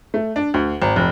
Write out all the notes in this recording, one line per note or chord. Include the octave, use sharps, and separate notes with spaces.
A3
D4
D2
G#1
F1